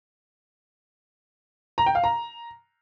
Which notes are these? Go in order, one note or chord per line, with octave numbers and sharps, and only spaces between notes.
A#5
G5
F5
A#5